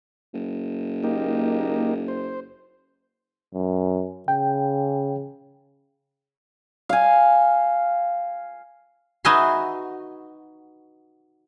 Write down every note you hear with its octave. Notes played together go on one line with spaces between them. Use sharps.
F#1
A#3 D#4 G4
C5
F#2
C#3 G5
F5 G#5
D#4 F#4 B4 E5 G#5 C6